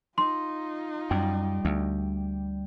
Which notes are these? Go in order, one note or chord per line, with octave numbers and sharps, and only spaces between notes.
D#4 F4 C6
F#2 G3 G5
D2